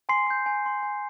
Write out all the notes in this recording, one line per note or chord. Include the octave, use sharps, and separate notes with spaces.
G#5 C6 C7
C6 G6
G#5
C6 G6
G#5